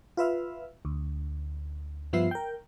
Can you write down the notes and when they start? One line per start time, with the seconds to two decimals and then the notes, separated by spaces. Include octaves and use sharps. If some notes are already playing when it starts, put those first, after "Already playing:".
0.17 F4 B4 E5 F5
0.85 D2
2.13 G2 F3 B3 F4 E5 C7
2.31 A#4 G5